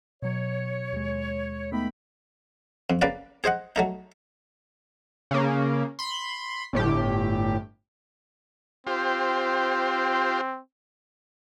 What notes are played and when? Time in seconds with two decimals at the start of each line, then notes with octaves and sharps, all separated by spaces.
0.22 B2 F#3 C#5
0.93 D#2 G#3
1.72 A3 B3 D#4 E5 G5 B5
2.90 F2
3.02 C#3 A#3 B4 D5
3.44 G#4 C5 D#5 F#5
3.76 F#3 A3 D#4
5.31 C#3 A#3
5.99 B5 C6
6.73 G1 A2 G4
8.87 C4 F4 G4 C5